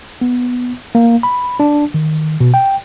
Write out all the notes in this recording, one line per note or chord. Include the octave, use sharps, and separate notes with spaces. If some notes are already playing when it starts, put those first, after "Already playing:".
B3
A#3
B5
D4
D#3
B2
G5